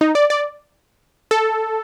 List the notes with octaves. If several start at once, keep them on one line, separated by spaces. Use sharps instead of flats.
D#4
D5
D5
A4